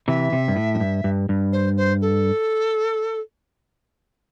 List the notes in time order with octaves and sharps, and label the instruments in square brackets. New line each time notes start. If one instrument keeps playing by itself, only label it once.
[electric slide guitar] C3 E3 [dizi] E5
[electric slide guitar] C3
G2
A2
F#2
G2
G2
G2
[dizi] C5
C5
A4